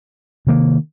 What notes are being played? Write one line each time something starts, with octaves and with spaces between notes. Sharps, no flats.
C3 D#3 A#3